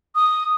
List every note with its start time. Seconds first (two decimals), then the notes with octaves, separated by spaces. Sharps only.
0.15 D#6